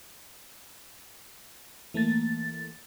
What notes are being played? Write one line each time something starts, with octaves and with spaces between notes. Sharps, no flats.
E3 A3 A#3 A6